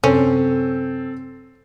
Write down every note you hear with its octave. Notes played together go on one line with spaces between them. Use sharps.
F#2 C3 C4 C#4 A4